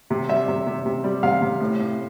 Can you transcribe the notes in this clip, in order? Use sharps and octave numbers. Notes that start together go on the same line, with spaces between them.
C3
G3 E5
C3
C3
C3
G3
C3 F5
C3
A2
A2